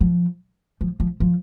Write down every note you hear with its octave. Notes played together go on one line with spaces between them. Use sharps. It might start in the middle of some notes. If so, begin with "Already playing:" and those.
F3
F3
F3
F3